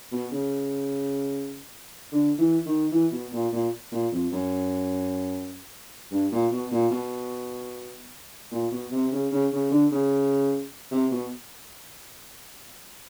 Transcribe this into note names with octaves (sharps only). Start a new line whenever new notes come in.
B2
C#3
D3
E3
D#3
E3
B2
A#2
A#2
A#2
F2
F#2
G2
A#2
B2
A#2
B2
A#2
B2
C3
C#3
C#3
C#3
D3
C#3
C3
B2